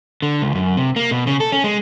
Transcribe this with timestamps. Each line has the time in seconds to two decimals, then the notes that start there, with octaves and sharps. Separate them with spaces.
0.22 D3
0.42 C#2
0.55 F#2
0.77 C3
0.96 A#3
1.11 B2
1.27 C#3
1.40 A4
1.52 C#4
1.64 G#3